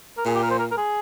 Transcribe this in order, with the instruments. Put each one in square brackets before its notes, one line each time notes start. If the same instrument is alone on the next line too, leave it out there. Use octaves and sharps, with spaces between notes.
[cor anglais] A#4
[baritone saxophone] A#2 [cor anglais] G#4
[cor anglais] G4
A#4
C5
A#4
A#4
G#4